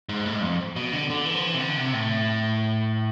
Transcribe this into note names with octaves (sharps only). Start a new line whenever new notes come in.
G#2
A2
G#2
F2
B2
D3
D3
E3
F3
E3
C3
D3
C3
A2